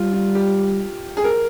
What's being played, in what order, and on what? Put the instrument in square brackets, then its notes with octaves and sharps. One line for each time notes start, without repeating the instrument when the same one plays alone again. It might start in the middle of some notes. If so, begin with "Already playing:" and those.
Already playing: [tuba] G3 [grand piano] F4
[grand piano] F4
G4
G#4
A#4